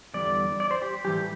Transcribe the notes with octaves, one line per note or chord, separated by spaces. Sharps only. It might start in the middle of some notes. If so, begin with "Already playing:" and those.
E2 D3 G3 D5
D5
C5
G4
A2 E3 G3 G4